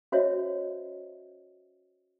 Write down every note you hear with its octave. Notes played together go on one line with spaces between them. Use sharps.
C#4 F#4 C5 C#5 D#5 E5